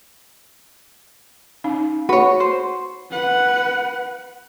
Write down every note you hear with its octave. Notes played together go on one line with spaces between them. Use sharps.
C#4 D#4 F5
F#4 B4 C#5
C5
B4 F#5